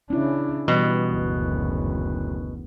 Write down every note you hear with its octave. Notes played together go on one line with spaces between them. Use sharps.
C#3 C#4 D4 E4
B2 E3 G3 D#5
F#1 D2